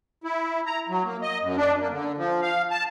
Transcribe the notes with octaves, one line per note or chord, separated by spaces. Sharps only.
E4
A#5
F#3
A#3
D#5
F#2
D4
A#3
D3
F3
F5
A5